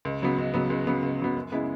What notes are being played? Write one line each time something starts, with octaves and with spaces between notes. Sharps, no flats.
C#2
C#3 F#3 B3
C#2
C#3 F#3 B3
C#2
C#3 F#3 B3
C#2
C#3 F#3 B3
F#2
C#3 G#3 B3 E4